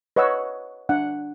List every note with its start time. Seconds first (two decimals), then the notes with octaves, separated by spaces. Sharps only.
0.16 B4 C#5 D#5 F#5 C#6 E6
0.89 D4 F#5